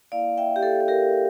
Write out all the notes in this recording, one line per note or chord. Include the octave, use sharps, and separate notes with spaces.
A#3 E4 D5 F5
E5 G5
G4
A4
A4
G4 A#4